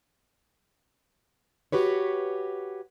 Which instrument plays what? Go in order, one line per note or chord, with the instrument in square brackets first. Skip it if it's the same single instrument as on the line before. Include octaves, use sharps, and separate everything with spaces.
[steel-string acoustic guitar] F#4 G4 B4 C#5